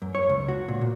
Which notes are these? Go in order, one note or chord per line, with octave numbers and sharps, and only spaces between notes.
F#2
C#5
C#2
F#4
A#2
A#2